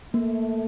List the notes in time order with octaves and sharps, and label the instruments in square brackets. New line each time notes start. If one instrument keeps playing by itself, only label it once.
[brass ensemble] A3 [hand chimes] A#3